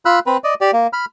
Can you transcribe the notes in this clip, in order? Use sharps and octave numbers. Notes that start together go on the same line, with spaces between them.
F4 B5 E6 F#6
C4 B4
D5 D#5
G4 D5
A#3
B5 F6